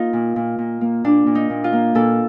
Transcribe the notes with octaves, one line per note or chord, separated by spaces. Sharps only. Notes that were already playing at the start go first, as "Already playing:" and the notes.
Already playing: A#3 D#4 F4
A#2
A#2
A#2
A#3
A#2 D4
A#2
D#4
A#2
F4
A#3
A#2 A4